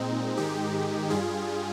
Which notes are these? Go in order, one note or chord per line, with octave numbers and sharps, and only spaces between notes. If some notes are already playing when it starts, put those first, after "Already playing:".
Already playing: A#2 G#3 C4 D#4
G#2 D#3 G#3 D#4 G4
G2 G3 F4 G#4